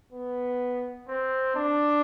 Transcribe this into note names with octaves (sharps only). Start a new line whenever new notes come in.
B3
C4
D4